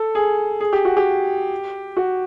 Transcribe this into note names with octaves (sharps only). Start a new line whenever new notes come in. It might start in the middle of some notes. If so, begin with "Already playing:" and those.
Already playing: A4
G#4
G#4
G4
F#4
G4
F#4